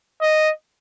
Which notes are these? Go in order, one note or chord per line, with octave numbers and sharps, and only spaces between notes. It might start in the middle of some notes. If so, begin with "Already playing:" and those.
D#5